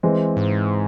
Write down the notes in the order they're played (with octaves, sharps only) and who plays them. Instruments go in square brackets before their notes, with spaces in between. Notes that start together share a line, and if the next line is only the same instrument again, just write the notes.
[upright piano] E3 G#3 C4
[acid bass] G#2